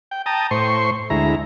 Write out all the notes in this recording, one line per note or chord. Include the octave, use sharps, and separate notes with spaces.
G5
G5 A5 A#5 D#6
A2 C5 C6 C#6
D2 G#3 E4 A#5